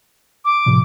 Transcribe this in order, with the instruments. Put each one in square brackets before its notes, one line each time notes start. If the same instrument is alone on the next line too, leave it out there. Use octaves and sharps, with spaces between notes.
[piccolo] D6
[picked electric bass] A2 C3 F3